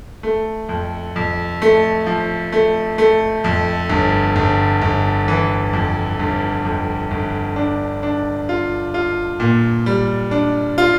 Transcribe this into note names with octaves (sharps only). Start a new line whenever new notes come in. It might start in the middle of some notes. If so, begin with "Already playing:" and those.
A3
F2
F2
A3
F3
A3
A3
F2
G1
G1
G1
E3
F2
G1
F2
G1
D4
D4
F4
F4
A#2
G3
D4
F4